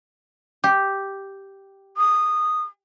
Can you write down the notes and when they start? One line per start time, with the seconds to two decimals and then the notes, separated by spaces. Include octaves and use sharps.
0.64 G4
1.97 D#6